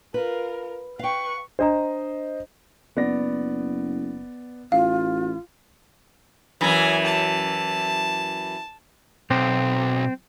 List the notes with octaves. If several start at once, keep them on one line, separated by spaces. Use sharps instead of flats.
F4 A#4 B4
B4 F5 G5 C#6
D4 C5 D#5 A#5
F#1 B3 D5 A#6
A1 F4 F5
F#2 E3 G#5
A5
B1 C4